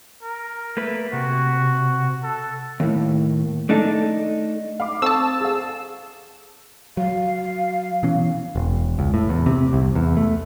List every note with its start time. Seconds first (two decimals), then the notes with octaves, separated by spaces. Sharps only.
0.23 A#4
0.77 A3 A#3 B4
1.13 C3 F#4
2.23 A4
2.80 D#2 A2
3.69 A3 D4 D#4 A4
4.80 F5 B5 D6
5.02 C4 A4 A5 C#6 D#6 E6
5.41 G#4 F5
6.97 F#3 F5
8.03 B2 E3 C#4
8.56 E1
8.99 C#2
9.14 A2
9.29 E2
9.46 C3
9.73 C2
9.95 E2
10.17 A3